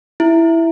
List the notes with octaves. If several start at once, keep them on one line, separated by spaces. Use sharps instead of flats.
E4